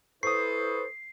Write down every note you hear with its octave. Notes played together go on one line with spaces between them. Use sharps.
E4 A4 B4 C5 C#6 D#6 C7